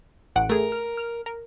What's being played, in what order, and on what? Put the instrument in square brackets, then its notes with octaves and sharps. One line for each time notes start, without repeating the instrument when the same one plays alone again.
[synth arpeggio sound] A1 F#5 D7
[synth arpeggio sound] A3 G#4 [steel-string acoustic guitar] A#4
[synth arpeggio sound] F6
F6
A#4